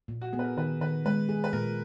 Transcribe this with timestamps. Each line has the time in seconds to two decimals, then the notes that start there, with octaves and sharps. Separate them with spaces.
0.08 A#2
0.21 F#4
0.33 B3 G#4
0.39 B4
0.44 A#4
0.57 D#3 B4
0.81 D#3 B4
1.05 G#3 B4
1.29 G#4
1.44 B4
1.53 A#2 A#4